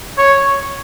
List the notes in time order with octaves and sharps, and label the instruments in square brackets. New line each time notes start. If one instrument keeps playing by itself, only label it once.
[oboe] C#5